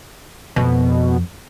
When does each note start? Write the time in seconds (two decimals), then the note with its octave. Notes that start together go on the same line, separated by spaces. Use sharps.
0.56 F2 B2